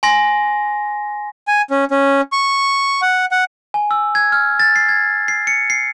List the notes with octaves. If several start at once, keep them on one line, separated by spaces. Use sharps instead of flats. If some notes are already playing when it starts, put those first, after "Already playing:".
G#5 C6 A#6
G#5
C#4
C#4
C#6
F#5
F#5
G#5
E6
G#6
F6
A6
C7
G#6
C7
C#7
C7